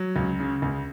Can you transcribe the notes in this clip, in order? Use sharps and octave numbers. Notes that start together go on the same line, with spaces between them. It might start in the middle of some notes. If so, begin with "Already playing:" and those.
Already playing: F#3
C#2
C#3
C#2